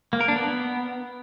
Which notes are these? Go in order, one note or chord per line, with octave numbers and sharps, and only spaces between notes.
A#3
A#4
D4
B3